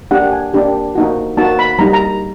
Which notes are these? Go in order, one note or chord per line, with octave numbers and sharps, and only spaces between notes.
A#3 D4 G4 F#5
G#5
A#3 D4 G4
A#3 D#4 F#4
A#3 D#4 F#4 A5
B5
G3 A#3 D#4 A#5
A#5